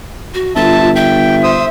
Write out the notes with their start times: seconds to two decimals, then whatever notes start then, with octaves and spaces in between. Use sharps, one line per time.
0.34 F#4
0.56 G1 F4 E5 A5
0.96 E5 G5
1.44 C5 D#6 E6